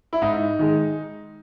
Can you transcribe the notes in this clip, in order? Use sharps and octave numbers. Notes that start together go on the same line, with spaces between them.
E4
G#2 D#4
D#3 G#3